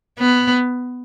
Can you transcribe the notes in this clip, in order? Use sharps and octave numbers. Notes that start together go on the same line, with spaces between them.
B3